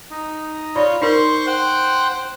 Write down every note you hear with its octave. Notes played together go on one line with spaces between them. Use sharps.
D#4
F4 C#5 D5 B5
D#4 A#4 C5 C6 C#6
C5 F#5 G5